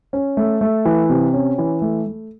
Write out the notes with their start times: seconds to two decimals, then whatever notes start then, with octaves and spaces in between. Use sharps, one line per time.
0.13 C#4
0.37 A3
0.61 A3
0.85 E3
1.10 C3
1.34 C#4
1.58 E3
1.82 A3
2.06 A3